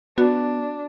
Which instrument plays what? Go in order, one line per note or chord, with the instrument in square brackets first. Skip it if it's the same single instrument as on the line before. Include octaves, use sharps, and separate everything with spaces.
[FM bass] B3 [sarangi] D4 [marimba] F#4